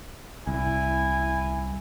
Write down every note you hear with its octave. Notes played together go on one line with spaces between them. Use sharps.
C2 E4 G#5